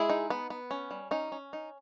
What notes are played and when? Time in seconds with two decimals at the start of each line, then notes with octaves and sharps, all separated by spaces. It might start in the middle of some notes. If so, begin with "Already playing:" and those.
Already playing: G#3 E4 G#4
0.10 D#4
0.30 B3
0.50 B3
0.71 C#4
0.91 G3
1.11 C#4 D#4
1.32 C#4
1.53 D#4